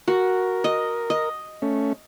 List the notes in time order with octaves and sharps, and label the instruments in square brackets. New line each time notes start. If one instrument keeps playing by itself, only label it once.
[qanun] F#4 [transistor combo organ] A#4
[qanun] D#5
D#5
[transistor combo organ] A3 C#4